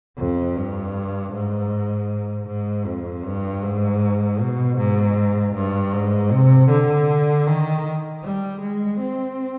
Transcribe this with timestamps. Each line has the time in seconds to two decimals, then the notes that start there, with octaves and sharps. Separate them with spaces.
0.18 F2
0.57 G2
1.34 G#2
2.48 G#2
2.87 F2
3.25 G2
3.64 G#2
4.41 B2
4.78 G#2
5.56 G2
5.94 G#2
6.32 C3
6.71 D3
7.47 D#3
8.24 G3
8.62 G#3
9.00 C4